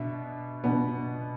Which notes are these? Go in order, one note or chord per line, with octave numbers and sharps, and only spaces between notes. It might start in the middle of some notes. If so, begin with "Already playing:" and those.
Already playing: B2 B3 D4 E5
B2 B3 D4